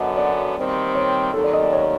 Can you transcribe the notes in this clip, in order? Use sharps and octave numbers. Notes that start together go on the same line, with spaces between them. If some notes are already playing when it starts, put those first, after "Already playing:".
Already playing: F#2 D3 F#3 B3 D#5
D5
D#2 D#3 G3 C4
C#5
D#2 D#3 F#3 A4
D5
D#5
D5
C#5